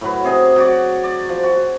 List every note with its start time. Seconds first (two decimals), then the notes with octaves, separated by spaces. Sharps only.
0.01 A2 F#3 B4
0.25 C3 G#4 D#5
0.56 F#3 F#4 D5
1.04 D5
1.29 F3
1.43 F#4